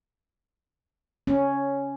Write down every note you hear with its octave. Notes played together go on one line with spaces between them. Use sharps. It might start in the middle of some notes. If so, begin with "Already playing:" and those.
C#4